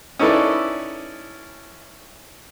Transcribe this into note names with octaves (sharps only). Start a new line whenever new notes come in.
C#4 D#4 E4 A4 B4 D5